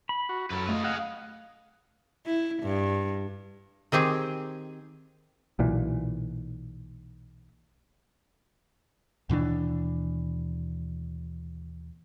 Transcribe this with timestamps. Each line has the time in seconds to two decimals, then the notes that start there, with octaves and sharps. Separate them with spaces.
0.09 B5
0.29 F#4
0.51 F#2 A4 B4
0.69 A3 F4 D#5
0.84 G#4 D#5 F5 F#5
2.26 E4
2.63 G2
3.92 D#3 C4 G4 G#4
5.59 B1 A#2 E3
9.30 D#2 B2 E3 D4